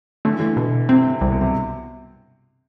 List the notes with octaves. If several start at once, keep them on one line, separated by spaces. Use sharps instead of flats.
D3 A3
E3
D3
B2
C3 C4
C3
C2
B2
C3